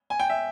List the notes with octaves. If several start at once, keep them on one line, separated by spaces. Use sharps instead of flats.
G#5
G5
E5